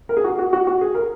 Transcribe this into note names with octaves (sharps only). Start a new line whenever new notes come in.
A#4
G#4
F#4
F#4
F#4
F#4
G#4
A#4